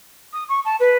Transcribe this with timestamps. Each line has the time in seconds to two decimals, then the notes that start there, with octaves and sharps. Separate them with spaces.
0.33 D#6
0.49 C#6
0.65 A5
0.80 B4